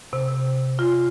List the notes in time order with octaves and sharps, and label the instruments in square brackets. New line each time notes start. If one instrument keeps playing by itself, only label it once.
[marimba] C3
F4